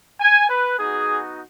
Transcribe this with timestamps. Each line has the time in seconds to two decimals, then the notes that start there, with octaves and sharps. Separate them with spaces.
0.20 G#5
0.49 B4
0.79 B3 D#4 F#4 G#4